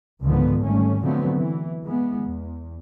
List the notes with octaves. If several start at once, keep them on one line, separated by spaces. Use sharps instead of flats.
C#2 G#2 D3 D#3 F3 B3
G#1 G3 A3 C#4
D3 F3 F#3 A3 B3 C4
E3
E3 G#3 B3
E2